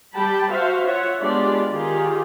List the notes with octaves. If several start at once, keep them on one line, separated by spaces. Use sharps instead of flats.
G3 G5 A5 B5
F#4 C5 E5 F5
F4 C#5 E5 F#5
G#3 B3 D4 F4 G4 D5
D#3 F4 G4 G#4